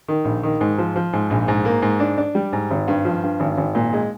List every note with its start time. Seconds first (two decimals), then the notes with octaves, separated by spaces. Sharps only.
0.08 D#3
0.25 A#1
0.43 D#3
0.61 G#2
0.78 F3
0.96 F3
1.13 G#2
1.30 A#1
1.48 G#2
1.65 A#3
1.82 G#2
2.00 D4
2.18 D4
2.35 G3
2.53 G#2
2.71 G#1
2.88 G2
3.05 F3
3.23 G2
3.40 G#1
3.57 G#1
3.75 A#2
3.93 G#3